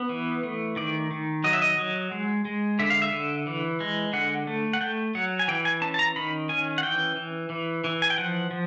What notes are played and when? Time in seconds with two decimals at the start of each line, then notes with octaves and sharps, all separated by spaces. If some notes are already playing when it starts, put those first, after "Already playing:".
Already playing: B3
0.09 E3
0.43 A3
0.76 D#3 D5
1.11 D#3
1.44 F#3 D#5
1.53 E5
1.62 D#5
1.78 F#3
2.12 G#3
2.45 G#3
2.79 D3 E5
2.90 F5
3.02 E5
3.12 D3
3.47 E3
3.80 G#3
4.13 D3 F#5
4.47 A3
4.73 F#5
4.81 A3 G5
5.15 F#3 F#5
5.39 G#5
5.48 E3 G5
5.65 G#5
5.81 C#4 A5
5.94 A5
5.99 A#5
6.16 D#3 B5
6.49 C#4 G#5
6.78 F#5
6.83 E3 G5
7.16 E3
7.50 E3
7.84 E3
8.02 G#5
8.10 G5
8.18 F3 F#5
8.51 F3